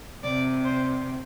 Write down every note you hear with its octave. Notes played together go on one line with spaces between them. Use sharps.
C3 D5
C5